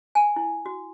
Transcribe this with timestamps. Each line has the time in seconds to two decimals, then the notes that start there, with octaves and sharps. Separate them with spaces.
0.15 G#5
0.36 E4
0.66 F#4